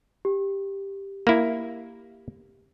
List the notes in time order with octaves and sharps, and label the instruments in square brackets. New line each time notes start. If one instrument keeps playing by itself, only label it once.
[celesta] G4
[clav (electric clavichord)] A#3 E4